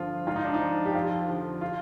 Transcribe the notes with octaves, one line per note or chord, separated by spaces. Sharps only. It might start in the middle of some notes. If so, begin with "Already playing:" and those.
Already playing: G2 D3 F3 F4
G#2 F4
D#4
D4
D#4
F3
G4
F2 F4
D3 F3
F4